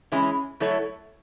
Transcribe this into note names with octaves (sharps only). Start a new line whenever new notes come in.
E3 G#3 C#4 E4
F#3 A3 E4 A4 C#5